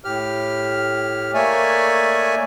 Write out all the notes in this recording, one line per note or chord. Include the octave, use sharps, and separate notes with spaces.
A2 G4 F6
A3 A#3 C#5 D5 E5 G#5